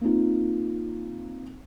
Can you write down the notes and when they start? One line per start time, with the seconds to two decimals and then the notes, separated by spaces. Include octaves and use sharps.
0.01 A#3 C4 D#4 F4